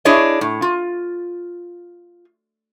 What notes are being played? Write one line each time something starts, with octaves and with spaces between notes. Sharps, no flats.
D4 E4 G#4 C#5 D#5
A2
F4